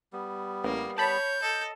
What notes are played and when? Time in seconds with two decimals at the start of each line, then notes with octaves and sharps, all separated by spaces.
0.13 G3 B3
0.64 A1 A#3
0.98 C#5 A5 B5 G6
1.42 A4 D#5